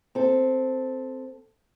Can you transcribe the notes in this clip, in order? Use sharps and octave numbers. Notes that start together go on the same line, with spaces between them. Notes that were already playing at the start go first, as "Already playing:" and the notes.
C4 A4